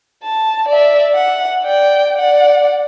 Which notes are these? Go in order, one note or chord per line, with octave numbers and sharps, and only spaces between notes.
A5
D5 E5
F#5
D5 G5
D5 F#5